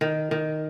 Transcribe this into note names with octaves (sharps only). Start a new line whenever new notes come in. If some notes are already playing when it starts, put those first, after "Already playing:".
D#3
D#3